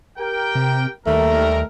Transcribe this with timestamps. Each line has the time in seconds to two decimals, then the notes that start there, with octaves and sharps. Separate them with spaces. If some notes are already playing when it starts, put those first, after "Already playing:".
0.18 G4 A#4 G5
0.55 C3
1.07 D#2 D#3 G3 A3 A#4